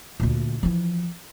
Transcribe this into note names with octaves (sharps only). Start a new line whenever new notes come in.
D2 A#2
E3 F3